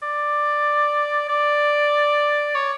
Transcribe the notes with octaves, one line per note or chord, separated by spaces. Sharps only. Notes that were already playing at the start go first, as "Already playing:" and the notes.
D5
D5
C#5